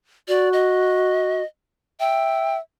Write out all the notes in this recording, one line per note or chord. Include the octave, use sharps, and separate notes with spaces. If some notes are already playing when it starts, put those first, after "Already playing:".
F#4 D5
D#5
E5 G5